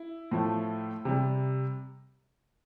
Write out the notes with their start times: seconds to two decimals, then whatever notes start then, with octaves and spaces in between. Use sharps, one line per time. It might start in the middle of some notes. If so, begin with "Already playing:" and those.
Already playing: E4
0.31 A2 F3 A3
1.05 C3 G3